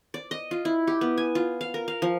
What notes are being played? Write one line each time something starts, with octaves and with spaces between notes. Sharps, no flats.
D5
D#5
F4
E4
G4
B3
G#5
F4
F5
A#4
F5
F3